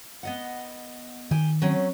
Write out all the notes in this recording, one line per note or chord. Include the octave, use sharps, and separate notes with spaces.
B3 D#5 F#5
D#3 G4 G#5
F#3 C4 C#4